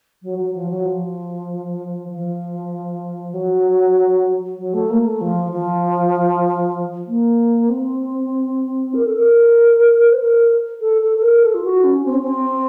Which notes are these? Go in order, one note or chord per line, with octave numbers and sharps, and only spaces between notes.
F#3
F#3
F3
F#3
F3
F3
F#3
F#3
A3
A#3
A3
F3
F3
A#3
C4
A#4
A4
A#4
C5
A#4
A4
A4
A4
A#4
A4
F4
F#4
C#4
C4
C#4
C4